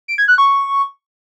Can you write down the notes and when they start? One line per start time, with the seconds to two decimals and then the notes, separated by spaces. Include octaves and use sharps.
0.08 D7
0.18 G#6
0.28 F#6
0.38 C#6